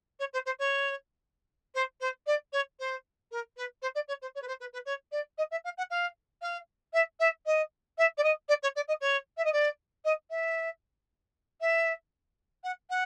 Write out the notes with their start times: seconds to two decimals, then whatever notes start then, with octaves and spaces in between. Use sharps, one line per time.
0.19 C#5
0.33 C5
0.46 C5
0.59 C#5
1.75 C5
2.00 C5
2.26 D5
2.52 C#5
2.79 C5
3.31 A#4
3.57 B4
3.82 C5
3.95 D5
4.08 C#5
4.22 C5
4.35 C#5
4.42 B4
4.47 C5
4.60 B4
4.73 B4
4.86 C#5
5.12 D5
5.38 D#5
5.51 E5
5.64 F5
5.77 F#5
5.90 F5
6.42 F5
6.93 E5
7.20 E5
7.46 D#5
7.98 E5
8.17 D5
8.23 D#5
8.48 D5
8.63 C#5
8.76 D5
8.88 D#5
9.01 C#5
9.37 E5
9.44 D#5
9.52 D5
10.05 D#5
10.30 E5
11.61 E5
12.64 F#5
12.90 F#5